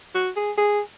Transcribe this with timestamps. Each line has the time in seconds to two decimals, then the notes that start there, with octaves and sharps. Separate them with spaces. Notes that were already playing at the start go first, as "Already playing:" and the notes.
0.15 F#4
0.36 G#4
0.58 G#4